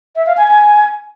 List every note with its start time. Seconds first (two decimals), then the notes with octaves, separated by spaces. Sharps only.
0.16 E5
0.26 F5
0.37 G#5
0.48 G#5